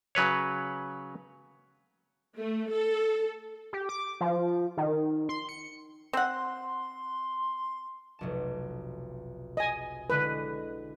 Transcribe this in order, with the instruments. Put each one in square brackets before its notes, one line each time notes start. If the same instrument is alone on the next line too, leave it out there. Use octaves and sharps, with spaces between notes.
[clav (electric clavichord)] C#3 F#3 B4 C#5
[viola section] A3
A4
[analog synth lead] G4
D6
F3
D#3
C6
C#7
[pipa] C4 F#5 [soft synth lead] C6
[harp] F1 B1 A5
[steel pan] D#5 G#5
[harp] D3 G#3 E4 [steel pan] B4